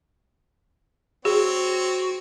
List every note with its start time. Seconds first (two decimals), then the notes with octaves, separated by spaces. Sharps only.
1.25 C4 F#4 G#4 C#5